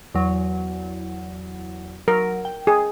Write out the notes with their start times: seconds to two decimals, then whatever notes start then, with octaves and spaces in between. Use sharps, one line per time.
0.14 E2 F#3
2.08 F#3 A#4
2.45 G5
2.67 G#4